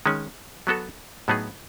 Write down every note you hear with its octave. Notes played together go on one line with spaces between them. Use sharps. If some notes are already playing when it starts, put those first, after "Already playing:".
D#3 G#3 C#4
F#3 B3 F#4 A4
A2 F#3 B3 D#4 G#4